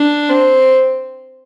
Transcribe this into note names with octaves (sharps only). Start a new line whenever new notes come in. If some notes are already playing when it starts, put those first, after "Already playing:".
Already playing: D4
C4